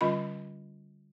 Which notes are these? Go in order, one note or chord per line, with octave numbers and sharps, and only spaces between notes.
D3 G3 C#4 F4 D#5 B5